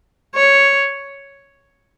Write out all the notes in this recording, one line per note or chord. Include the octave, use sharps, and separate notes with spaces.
C#5